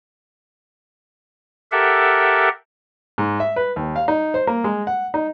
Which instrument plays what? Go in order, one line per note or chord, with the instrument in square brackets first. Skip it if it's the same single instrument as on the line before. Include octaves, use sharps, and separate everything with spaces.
[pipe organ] G4 A4 A#4 E5 F#5
[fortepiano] G#2
E5
B4
D#2
F5
D#4
C5
A#3
G#3
F#5
D#4